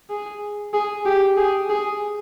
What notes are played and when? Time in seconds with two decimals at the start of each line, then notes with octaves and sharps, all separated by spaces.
0.10 G#4
0.74 G#4
1.06 G4
1.37 G#4
1.70 G#4